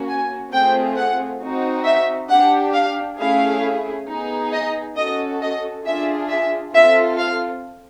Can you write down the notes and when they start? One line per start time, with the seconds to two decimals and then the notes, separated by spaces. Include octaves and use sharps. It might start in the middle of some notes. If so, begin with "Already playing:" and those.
Already playing: A#3 C#4 F#4
0.09 G#5
0.52 A3 C4 F4 G#4 G5
0.97 F#5
1.42 C4 D#4 F#4
1.86 E5
2.30 D4 G4 F#5
2.75 F5
3.19 A3 C#4 E4 G#4 F5
4.07 B3 D#4 G#4
4.52 D#5
4.96 C#4 F#4 A4 D#5
5.41 D#5
5.86 D4 F4 G#4 E5
6.29 E5
6.74 C4 F4 A4 E5
7.19 F5